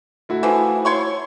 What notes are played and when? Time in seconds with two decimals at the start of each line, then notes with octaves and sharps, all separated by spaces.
0.29 A3 E4 F#4
0.43 E3 F3
0.85 C#5 C6 C#6